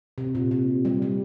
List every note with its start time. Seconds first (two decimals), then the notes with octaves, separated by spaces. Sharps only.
0.18 C3
0.35 A#2
0.51 C3
0.85 G3
1.02 G3